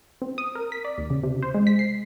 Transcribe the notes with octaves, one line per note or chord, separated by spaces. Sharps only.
C4
D#6
A#4
B6
D5
D#2
C#3
C3
C5
G#3
B6
C7